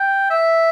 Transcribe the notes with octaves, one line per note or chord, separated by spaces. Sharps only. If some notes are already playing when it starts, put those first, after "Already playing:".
Already playing: G5
E5